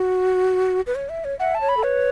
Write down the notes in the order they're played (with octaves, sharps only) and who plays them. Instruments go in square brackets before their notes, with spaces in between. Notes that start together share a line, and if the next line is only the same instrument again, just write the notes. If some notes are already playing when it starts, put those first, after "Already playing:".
Already playing: [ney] F#4
B4
C#5
E5
C#5
[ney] E5 [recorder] F#5
[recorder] A5
[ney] C#5
[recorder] B5
[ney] A4
[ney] B4 [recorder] C#5